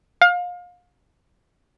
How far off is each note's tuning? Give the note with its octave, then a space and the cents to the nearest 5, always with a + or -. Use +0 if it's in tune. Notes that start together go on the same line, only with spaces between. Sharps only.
F5 +30